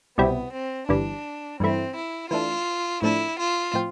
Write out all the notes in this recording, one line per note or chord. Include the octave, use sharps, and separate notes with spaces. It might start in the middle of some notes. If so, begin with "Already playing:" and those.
C2 B2 G3 B3 C4 E4
C4
G1 G2 E3 G3 D4
G2 E3 A3 C4 E4
E4
E3 A3 D4 F4
A2 F3 A3 D4 E4
F4
A2 F3 C4